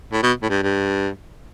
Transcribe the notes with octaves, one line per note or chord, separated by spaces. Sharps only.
A2
B2
A2
G2
G2